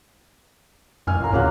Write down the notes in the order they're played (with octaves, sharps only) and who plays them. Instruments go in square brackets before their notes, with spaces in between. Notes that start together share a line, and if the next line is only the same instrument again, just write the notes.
[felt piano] A1 G#5 F6 [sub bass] F#2
[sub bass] A2 [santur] F4 A#4
[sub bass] D2 [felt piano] C#3 F5 F#6 [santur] F#3 A#3 F4